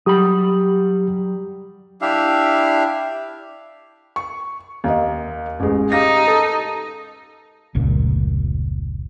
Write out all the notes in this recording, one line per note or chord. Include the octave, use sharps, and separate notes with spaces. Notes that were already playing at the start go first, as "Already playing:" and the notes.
F#3 G3 G4 B5 D#6
D4 E4 G4 E5 F5
C#6
D#2 A#4 D#5
A1 G#3
D#4 G4 F5 A#6
A4
F1 C#2 A#2